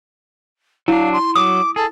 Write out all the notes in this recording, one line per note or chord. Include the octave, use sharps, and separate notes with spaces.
F#3 D4 E4 F5
C6
F#3 D6 D#6
G#4 A4